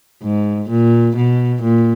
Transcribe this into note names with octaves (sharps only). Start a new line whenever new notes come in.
G#2
A#2
B2
A#2